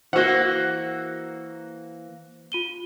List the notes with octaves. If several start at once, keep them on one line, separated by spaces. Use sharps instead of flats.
E3 A#3 F#4 C5 F#5 G7
F4 D#7 G7